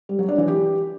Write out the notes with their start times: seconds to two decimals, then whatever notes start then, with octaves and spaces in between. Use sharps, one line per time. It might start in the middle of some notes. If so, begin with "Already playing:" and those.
0.09 G3
0.19 F#3
0.28 D4
0.38 E3
0.48 G4